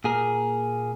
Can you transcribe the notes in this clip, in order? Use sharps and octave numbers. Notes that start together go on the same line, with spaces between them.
A#2 G#4 A#4